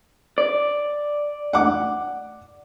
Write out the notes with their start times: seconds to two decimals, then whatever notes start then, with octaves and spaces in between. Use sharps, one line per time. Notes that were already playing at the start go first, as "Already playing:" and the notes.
0.38 D5
1.53 F#5 D6